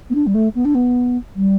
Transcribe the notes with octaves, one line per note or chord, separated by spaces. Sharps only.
B3
D4
G3
A3
B3
D4
B3
G3